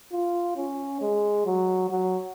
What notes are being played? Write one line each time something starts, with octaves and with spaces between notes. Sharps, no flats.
F4
C#4
G#3
F#3
F#3